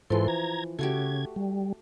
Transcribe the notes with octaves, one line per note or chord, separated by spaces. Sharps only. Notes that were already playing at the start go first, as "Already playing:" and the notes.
G#2 E3 F3 A4 C6
A#5 G#6
C#3 A3 F#4 G4 G#6
G3